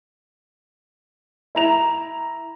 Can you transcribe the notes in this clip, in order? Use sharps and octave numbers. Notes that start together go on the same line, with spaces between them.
E4 A#5 F7